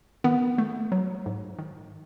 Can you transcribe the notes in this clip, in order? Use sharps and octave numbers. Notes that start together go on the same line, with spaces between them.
D#3 B3
A3
F#3
G#2
D#3